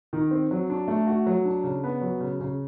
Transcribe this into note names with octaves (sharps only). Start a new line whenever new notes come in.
D#3
C4
F#3
D4
A3
F#4
F#3
D4
C#3
B3
F#3
C#3
C#3